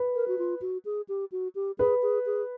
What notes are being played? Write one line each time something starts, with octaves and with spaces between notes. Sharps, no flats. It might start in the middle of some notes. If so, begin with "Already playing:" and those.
Already playing: B4
A#4
F#4
F4
F#4
G#4
G4
F#4
G4
G#4 B4
G#4
G#4